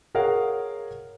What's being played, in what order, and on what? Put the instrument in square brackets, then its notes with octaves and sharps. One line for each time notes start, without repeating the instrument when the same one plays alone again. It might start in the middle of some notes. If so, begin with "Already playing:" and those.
[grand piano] G#4 A#4 C#5 F5 F#5